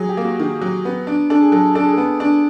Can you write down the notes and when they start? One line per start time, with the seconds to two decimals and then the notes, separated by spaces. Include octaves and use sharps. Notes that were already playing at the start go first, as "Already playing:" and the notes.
Already playing: F#3 G#4
0.09 G4
0.17 A#3
0.25 F#4
0.39 D#3 G#4
0.61 F#3
0.85 B3
1.07 D4
1.30 D4 A4
1.40 G#4
1.52 F#3 A4
1.75 D4 A4
1.84 G#4
1.93 B3 A4
2.20 D4